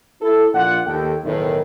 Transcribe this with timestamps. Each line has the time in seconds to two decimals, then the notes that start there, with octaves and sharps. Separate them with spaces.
0.22 E4 A4
0.54 A#1 A#2 F4 D5 F#5
0.86 D#2 A4 G5
1.24 B1 E2 A2 D#3